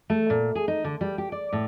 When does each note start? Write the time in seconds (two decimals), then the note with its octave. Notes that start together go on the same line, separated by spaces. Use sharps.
0.10 A3
0.30 A#2
0.55 G#4
0.68 D#4
0.84 D3
1.01 G3
1.18 G4
1.32 D5
1.53 A2